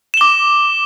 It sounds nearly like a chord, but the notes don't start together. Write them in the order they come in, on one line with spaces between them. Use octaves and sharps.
E7 G7 D6